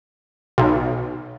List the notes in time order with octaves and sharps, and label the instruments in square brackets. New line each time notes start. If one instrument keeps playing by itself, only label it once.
[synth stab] B1